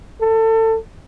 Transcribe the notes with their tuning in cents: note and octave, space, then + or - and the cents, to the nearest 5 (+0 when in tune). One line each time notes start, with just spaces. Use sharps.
A4 +25